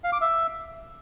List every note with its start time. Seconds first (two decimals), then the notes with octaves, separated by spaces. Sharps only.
0.04 F5
0.13 D6
0.21 E5